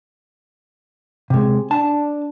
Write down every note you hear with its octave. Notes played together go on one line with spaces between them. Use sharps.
C3 G#3
D4 A5